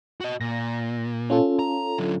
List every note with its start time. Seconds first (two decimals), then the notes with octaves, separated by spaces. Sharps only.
0.21 F#4 D#5
0.41 A#2 A#6
1.30 C#4 F4 A4
1.59 A#5
1.99 D3 F#3